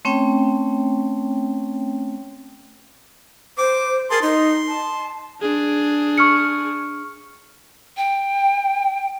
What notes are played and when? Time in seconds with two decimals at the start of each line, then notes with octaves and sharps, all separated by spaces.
0.05 A3 C4 C#4 C#5 G5
3.58 C5 D6
4.11 G#4 A#4 A5 C6
4.22 D#4 C6
4.68 A5
5.42 D4 G#4
6.18 C#6 F6 C#7
7.97 G5